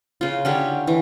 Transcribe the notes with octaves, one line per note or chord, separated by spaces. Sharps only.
C#3 F4
D3 C#4 G4
E3